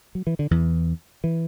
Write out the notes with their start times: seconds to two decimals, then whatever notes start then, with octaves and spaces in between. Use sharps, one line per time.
0.15 F#3
0.27 E3
0.39 D3
0.51 E2 E3
1.24 E3